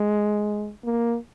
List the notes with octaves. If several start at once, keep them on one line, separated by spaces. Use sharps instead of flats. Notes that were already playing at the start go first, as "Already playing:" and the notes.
Already playing: G#3
A#3